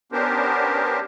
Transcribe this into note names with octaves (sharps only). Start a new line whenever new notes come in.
B3 C#4 D4 G4 A#4 C5